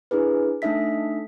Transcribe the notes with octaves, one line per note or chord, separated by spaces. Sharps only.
D4 E4 G#4 B4
A3 D4 D#4 A4 E5 B6